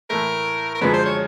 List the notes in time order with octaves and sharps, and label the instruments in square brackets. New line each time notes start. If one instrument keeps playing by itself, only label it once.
[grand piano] A2 E3 A3 [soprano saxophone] A#4
[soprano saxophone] A#4
[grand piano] F#2 D3 F3 G#3 [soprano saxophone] B4
[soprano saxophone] C5
C#5